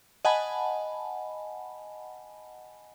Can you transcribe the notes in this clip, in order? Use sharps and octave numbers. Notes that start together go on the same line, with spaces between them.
D#5 F#5 G#5 A5 B5